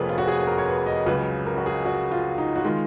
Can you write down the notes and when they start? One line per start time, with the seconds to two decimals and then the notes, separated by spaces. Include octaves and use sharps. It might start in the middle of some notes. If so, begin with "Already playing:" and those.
Already playing: F1 F2 F3 A#3 G#4 B4 C#5
0.09 F4
0.18 F#4
0.27 G#4
0.43 G#4
0.47 A#4
0.58 C#5
0.67 B4
0.86 D#5
1.06 C#2 C#3 F#3 B4
1.46 A#4
1.57 F#4
1.66 G#4
1.85 F#4
2.11 F4
2.38 D#4
2.56 F#4
2.64 D#3 G#3 F4